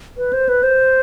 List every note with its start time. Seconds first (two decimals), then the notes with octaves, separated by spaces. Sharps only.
0.17 B4
0.33 C5
0.49 B4
0.63 C5